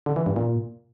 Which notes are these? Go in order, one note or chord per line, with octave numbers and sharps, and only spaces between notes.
D3
E3
G2
A#2